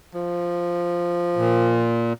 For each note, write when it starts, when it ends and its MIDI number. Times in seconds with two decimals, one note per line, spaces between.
0.14 1.90 53
1.37 2.13 46